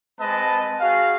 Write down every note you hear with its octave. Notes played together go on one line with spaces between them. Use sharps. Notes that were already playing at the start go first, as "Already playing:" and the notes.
G#3 C4 B4 D#5 A5
F#4 G#4 F5